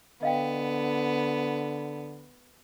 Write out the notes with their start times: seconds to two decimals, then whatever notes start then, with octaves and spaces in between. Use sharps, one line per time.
0.23 D3 B3 D#5 F5 G5